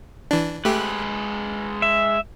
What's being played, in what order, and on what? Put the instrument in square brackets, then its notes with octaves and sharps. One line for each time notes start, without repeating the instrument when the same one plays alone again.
[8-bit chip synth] E3 D4
[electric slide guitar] G#3 B4 [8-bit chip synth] A3 G4
[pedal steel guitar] E5